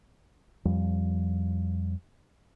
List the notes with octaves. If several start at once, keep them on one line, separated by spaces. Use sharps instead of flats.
F2 F3 G3